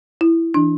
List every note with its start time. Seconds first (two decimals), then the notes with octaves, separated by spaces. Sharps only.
0.21 E4
0.54 E3 D4